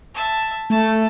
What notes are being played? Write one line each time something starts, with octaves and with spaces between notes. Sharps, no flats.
E5 A5
A3 A5